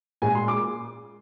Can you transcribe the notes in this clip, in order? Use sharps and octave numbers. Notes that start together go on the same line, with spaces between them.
A#2 G#3 G#5
C6
D6